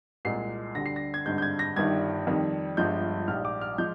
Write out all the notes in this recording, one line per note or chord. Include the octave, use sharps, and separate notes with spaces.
C2 A#2 G#3 C7
D2 D3 G3 A#6
C7
A#6
G#6
G#1 G2 D3 G#3 G6
G6
G#6
A#6
G1 G2 D#3 G3 G#6
F2 D#3 G3
G1 G2 F3 G#3 G6
A#1 G#2 G3 F6
D6
F6
F3 G#3 G6